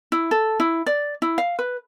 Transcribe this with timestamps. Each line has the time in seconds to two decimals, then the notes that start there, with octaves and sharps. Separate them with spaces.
0.12 E4
0.31 A4
0.60 E4
0.86 D5
1.22 E4
1.38 F5
1.59 B4